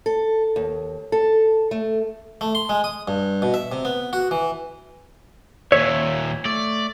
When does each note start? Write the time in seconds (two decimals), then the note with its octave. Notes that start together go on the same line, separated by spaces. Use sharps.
0.06 A4
0.56 D#2
1.12 A4
1.71 A3
2.41 A3
2.55 C6
2.69 G#3
2.84 D#6
3.08 G2
3.42 B2
3.54 E5
3.72 C3
3.85 B3
4.13 F#4
4.31 E3
5.72 D#2 A#2 C#5 E5
6.45 A3 D5